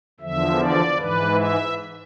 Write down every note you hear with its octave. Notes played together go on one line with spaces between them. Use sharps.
E2 D3 F3 E5
D5
G#2 E3 B4
E5